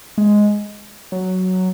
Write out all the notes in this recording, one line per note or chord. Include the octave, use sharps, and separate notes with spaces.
G#3
F#3